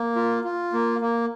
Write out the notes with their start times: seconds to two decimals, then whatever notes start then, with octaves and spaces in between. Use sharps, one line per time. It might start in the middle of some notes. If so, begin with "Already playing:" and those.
Already playing: A#3
0.16 F4
0.44 F4
0.73 A#3
1.01 A#3